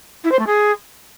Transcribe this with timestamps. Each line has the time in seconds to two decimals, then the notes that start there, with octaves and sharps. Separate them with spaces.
0.24 E4
0.31 C5
0.39 A3
0.46 G#4